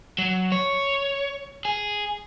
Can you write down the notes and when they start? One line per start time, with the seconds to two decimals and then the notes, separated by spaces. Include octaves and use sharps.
0.18 F#3
0.52 C#5
1.65 G#4